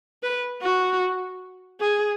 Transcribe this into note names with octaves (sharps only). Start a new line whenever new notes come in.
B4
F#4
G#4